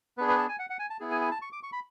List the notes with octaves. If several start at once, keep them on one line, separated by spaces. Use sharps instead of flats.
B3 D4 G#4 B4
B4
A5
G#5
F#5
F#5
G#5
A5
B3 E4 G#4
G#5
G#5
A5
C#6
D6
C#6
B5